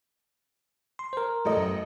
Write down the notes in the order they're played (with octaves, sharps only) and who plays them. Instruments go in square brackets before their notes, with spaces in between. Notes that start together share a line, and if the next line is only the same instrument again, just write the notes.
[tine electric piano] C6
A#4 C5
[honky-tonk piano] A1 A4 D#5
[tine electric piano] F#2